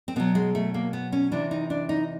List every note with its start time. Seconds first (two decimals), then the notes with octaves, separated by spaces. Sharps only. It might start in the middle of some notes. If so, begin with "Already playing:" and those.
0.08 C4
0.16 B2 F#3 B3
0.35 G#3
0.55 A3
0.74 A#3
0.93 B3
1.12 C#4
1.32 C3 E3 D4
1.51 D#4
1.70 D4
1.89 D#4